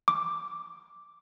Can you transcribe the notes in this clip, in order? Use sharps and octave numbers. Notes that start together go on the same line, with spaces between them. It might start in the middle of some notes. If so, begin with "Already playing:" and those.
D6